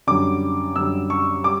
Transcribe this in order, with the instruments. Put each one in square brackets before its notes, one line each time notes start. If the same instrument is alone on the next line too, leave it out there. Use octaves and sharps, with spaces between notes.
[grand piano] F#2 D3 G3 D6
F#2 D3 G3 E6
C#6
G3 D6